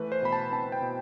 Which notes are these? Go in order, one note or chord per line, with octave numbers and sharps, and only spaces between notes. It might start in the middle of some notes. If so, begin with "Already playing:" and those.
Already playing: E3 A3 B4
C5
B2 B5
A5
C4 A5
G5
B2